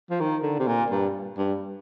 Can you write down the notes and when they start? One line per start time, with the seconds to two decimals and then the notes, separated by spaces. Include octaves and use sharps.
0.10 F3
0.20 D#3
0.43 D3
0.59 C3
0.67 A#2
0.90 G2
1.37 G2